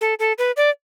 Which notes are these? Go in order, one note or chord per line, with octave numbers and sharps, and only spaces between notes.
A4
A4
B4
D5